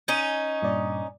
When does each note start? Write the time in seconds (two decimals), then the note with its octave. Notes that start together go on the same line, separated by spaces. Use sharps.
0.08 C#4 D#4
0.62 G2 A#2 D5